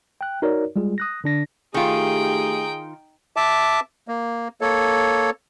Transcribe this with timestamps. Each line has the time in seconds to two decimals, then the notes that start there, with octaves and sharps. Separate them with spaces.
0.21 G5 F#6
0.42 D#4 F#4 A#4 C#5 D5
0.76 G3 G#3 F4 G#4
0.98 D#6 F#6 A#6
1.24 D3 D4 A#6
1.74 D#3 A3 D#4 F4 G4 G#4 G5
3.36 E5 A5 D6
4.08 A#3
4.61 A#3 A4 C#5